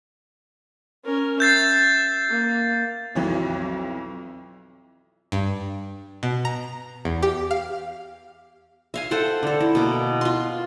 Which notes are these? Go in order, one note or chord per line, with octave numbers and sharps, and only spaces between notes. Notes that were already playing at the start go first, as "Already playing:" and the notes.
C#4 A#4
E5 G6 A6 C7
A#3
B1 F2 E3 F#3
G2
B2
A#5
E2
G4
F5
E5 F5 G#5
A4 C5 F#5 G5
D3 A4
E4
B2 A#3
F4 C6